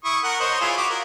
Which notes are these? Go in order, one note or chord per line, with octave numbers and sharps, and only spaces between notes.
E4 C#6 D#6
A#4 F#5
C5 C#5 D#5
E4 F4 G#4
F#4 D6
A#4